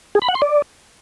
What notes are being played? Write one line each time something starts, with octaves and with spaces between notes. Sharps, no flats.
G#4
B5
F#5
C6
D5